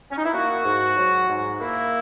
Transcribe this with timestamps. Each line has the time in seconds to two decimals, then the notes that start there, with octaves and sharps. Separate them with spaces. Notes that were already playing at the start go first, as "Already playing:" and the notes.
0.11 C#4
0.18 D#4
0.25 E4
0.33 A#3 F#4
0.65 G#2
0.97 F#3
1.29 G#2
1.61 A#3 E4